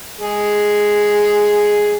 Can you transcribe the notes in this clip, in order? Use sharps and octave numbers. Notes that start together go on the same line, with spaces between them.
G#3 G#4